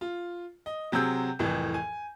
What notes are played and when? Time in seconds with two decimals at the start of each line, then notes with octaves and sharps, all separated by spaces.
0.01 F4
0.66 D#5
0.92 C3 F#3 C4 G#4 E6 G6
1.39 C2 F2 A2 E3
1.74 G#5